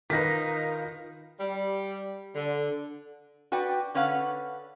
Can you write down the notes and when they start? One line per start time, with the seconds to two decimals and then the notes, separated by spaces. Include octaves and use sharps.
0.10 D#3 D#4 F4 A#4 B4 A#6 B6
1.40 G3
2.35 D3
3.52 F#4 B4 D5 G5
3.95 D3 C#4 B4 F5 F#5